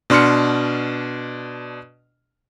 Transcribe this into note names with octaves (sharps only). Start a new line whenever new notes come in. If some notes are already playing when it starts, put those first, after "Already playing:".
B2 D4 C6 F6 C#7